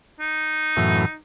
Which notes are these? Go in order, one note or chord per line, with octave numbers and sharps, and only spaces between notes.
D#4
F#2 A2 E3